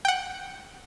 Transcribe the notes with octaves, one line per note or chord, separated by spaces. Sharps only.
F#5 G5